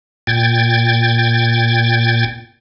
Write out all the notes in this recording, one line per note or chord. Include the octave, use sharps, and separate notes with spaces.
A#2 G5 G#6 A6